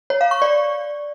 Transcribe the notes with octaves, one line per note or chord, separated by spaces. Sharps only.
C#5
F5
C#6
D5